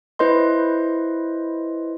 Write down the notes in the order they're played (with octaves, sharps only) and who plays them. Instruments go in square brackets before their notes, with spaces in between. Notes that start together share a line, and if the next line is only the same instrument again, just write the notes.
[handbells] E4 B4 C5 D#5 C6